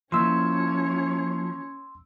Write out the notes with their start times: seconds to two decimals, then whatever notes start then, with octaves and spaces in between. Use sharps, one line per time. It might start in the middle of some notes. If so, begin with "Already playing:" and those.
0.12 F3 A#3 C#4 E4 C#5 C6 E6